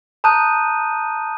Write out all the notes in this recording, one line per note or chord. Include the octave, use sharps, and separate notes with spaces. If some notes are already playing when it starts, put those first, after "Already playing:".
A5 A#5 D#6 F#6 G6 D#7